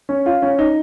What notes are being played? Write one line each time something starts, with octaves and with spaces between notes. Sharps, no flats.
C#4
F4
C#4
D#4